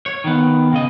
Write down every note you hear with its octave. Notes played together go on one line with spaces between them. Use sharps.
C#5
D#3 B3
C#3 D#5